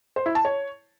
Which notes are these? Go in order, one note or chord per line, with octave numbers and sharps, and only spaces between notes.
C5
E4
A5
C#5